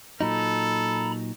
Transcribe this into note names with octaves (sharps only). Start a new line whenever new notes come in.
A#2 F#3 D#4 A4 A#5 B5